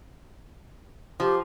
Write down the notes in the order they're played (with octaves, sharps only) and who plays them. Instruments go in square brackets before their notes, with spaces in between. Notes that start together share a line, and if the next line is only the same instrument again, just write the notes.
[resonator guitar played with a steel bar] F3 [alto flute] G4